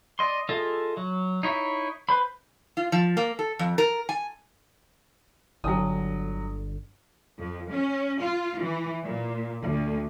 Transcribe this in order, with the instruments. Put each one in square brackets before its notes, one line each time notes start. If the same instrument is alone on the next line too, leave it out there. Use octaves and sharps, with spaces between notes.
[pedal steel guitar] D5 D#5 C6
F4 G#4 A4 D#5 E5
F#3
D#4 E4 C#5 E5
B4 C5 B5
[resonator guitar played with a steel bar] F4
F3
A#3
A4
F2
A#4
G#5
[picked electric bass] G1 D3 [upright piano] F#3 D#6
[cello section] F2
C#4
F4
E3
A#2
D2